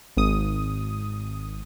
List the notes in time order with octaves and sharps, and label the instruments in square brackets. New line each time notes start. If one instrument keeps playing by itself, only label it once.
[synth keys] G#1 D#6